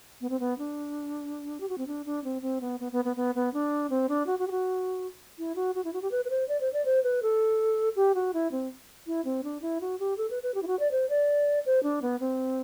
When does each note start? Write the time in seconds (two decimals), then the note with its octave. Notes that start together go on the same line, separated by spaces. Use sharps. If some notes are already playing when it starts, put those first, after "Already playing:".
0.21 B3
0.30 C4
0.40 B3
0.58 D4
1.60 G4
1.69 F#4
1.78 C4
1.87 D4
2.06 D4
2.24 C4
2.42 C4
2.61 B3
2.80 B3
2.92 B3
3.05 B3
3.16 B3
3.35 B3
3.54 D4
3.90 C4
4.09 D4
4.27 F#4
4.39 F#4
4.48 G4
4.51 F#4
5.38 E4
5.56 F#4
5.75 F#4
5.85 E4
5.93 F#4
6.02 G4
6.11 B4
6.25 B4
6.30 C5
6.48 D5
6.61 C5
6.73 D5
6.85 C5
7.04 B4
7.23 A4
7.96 G4
8.15 F#4
8.34 E4
8.52 C4
9.07 E4
9.25 C4
9.44 D4
9.62 E4
9.81 F#4
10.00 G4
10.18 A4
10.30 B4
10.43 B4
10.54 G4
10.63 E4
10.67 F#4
10.80 D5
10.91 C5
11.10 D5
11.66 C5
11.83 D4
12.02 B3
12.20 C4